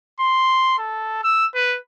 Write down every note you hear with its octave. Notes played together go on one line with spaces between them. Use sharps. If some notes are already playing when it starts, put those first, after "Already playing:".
C6
A4
E6
B4